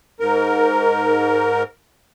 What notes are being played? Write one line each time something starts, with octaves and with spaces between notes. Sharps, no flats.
G#2 A#4